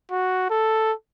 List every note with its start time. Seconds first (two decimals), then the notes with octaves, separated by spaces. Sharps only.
0.11 F#4
0.50 A4